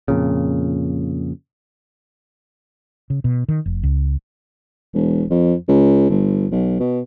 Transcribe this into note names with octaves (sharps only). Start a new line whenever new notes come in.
F2 A#2 C#3
C#3
B2
D#3
F1
C#2
E1
F2
C#2
G1
B1
B2